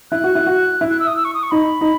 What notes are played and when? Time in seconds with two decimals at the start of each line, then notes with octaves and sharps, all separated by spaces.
0.11 E4 F#6
0.24 F#4
0.35 E4
0.47 F#4
0.81 E4
0.90 F#6
1.00 E6
1.07 D#6
1.17 E6
1.25 C#6
1.34 D#6
1.43 C#6
1.51 D#4 B5
1.81 D#4